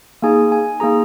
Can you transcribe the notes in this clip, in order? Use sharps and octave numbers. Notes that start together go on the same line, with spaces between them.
A#3 D#4 G#4 G#5
G#5
A#3 D#4 G#4 A#5